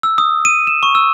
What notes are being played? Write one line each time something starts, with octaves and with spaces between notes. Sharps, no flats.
E6
D#6
D#7
E7
C#6
E6